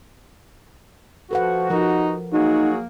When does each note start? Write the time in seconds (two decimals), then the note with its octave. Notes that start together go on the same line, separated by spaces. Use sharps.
1.31 F3 F#4 A4 B4 F#5
1.70 F3 D#4 A#4
2.33 F#3 A#3 D#4 F#4 G#4